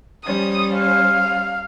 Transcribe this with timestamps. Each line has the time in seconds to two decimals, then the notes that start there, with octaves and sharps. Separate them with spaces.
0.25 G3 C#4 C5 D#6
0.75 F5